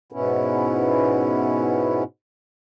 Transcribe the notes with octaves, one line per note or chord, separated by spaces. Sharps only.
G#2 B2 B3 C#4 E4